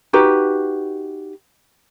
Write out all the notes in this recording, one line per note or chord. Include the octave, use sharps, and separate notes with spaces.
D#4 F#4 G4 B4